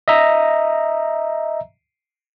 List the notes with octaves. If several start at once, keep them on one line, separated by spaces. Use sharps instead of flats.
D#5 E5 A#5